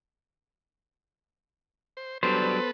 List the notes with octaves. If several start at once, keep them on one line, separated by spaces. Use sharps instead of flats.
C5
F#3 G3 B3 D4 A4 B4 C5